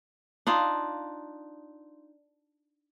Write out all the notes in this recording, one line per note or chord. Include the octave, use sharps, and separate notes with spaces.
D4 D#4 F4